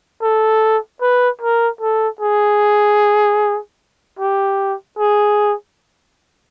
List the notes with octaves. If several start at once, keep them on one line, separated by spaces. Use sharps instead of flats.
A4
B4
A#4
A4
G#4
G4
G#4